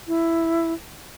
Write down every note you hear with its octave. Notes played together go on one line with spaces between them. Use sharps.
E4